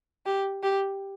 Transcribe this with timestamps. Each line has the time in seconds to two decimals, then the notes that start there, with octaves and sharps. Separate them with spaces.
0.26 G4
0.63 G4